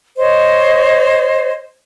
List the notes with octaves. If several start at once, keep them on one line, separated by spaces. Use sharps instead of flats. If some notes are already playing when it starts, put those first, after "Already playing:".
C5 C#5 D#5